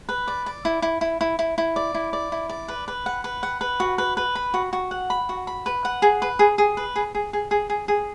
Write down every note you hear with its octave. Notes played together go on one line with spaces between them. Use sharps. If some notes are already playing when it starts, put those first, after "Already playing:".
B4
D5
D5
E4
E4
E4
E4
E4
E4
D5
E4
D5
E4
D5
B4
B4
F#5
B4
F#5
B4
F#4
B4
B4
B5
F#4
F#4
F#5
B5
F#4
B5
B4
F#5
G#4
B4
G#4
G#4
B4
G#4
G#4
G#4
G#4
G#4
G#4